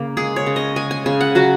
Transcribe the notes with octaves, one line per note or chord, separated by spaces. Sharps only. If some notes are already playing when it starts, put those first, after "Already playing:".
Already playing: C#3 A#3
G#3 G#4
C#5
C#3
D#5
G#3 G#5
G#5
C#3 G#5
F#5
F#3 F#4